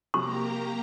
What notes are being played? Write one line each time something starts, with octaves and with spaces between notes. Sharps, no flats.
C3 F#3 A#3 G4 A#5 C#6